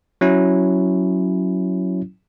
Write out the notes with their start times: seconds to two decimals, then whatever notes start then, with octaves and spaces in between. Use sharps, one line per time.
0.21 F#3 C#4 E4